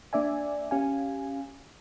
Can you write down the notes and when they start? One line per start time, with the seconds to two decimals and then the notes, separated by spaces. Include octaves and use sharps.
0.13 A#3 D4 D5 E5 G#5
0.71 C#4 G4 F5 G#5